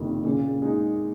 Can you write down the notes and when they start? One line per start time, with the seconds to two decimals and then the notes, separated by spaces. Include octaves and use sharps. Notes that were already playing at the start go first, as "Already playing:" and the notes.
Already playing: F#1 F2 C3 D#3
0.25 A#2 C#3
0.62 G#3 D#4